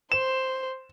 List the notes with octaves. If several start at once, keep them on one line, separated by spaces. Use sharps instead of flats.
C5 E7